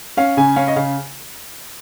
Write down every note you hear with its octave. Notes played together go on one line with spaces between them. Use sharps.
C#4 F5
C#3 G#5
C#4 F5
D#5
C#3 F5